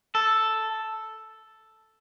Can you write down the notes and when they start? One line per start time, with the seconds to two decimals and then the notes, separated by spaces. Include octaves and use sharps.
0.15 A4